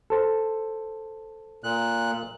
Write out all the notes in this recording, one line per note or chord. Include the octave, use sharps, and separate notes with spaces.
A4 C5
A#2 F#6